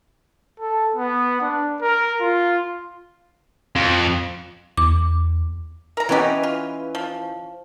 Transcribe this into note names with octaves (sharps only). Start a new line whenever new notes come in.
A4
B3
D4
A#4
F4
F2
E2 D6
A#4 A#5
E3 B3 C#4 E4 G4 B4 D#5
F4
F3